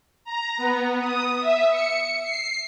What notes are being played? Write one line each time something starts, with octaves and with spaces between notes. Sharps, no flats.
A#5
B3
D#6
E5
C#7
C7